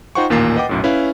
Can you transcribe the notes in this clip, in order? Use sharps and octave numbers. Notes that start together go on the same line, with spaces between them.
D#4 F4 C5 F#5 G5 C#6
A1 D#2 A#2 A#3 A6 C7
B4 D#5 F#5 G5 D6
B1 F#2 A2
C#4 E4 B4 F5